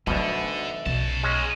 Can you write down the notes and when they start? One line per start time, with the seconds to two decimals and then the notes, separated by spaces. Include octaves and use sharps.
0.07 D2 B2 D3 F#3 D#4
0.86 B1 C#3 A5
1.23 G#3 C#4 D#4 F#4